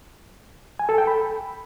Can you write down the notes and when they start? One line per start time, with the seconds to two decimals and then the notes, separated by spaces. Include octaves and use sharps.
0.79 G#5
0.89 A4
0.98 G5
1.07 B5